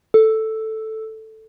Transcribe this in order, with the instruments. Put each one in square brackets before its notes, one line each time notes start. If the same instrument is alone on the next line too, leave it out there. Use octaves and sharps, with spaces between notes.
[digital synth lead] A4